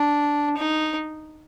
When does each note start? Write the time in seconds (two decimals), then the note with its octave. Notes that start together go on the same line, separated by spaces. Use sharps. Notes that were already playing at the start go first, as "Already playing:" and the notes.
Already playing: D4
0.57 D#4